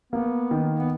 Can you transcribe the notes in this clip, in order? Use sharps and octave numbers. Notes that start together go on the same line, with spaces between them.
A#3 B3
D#3
B3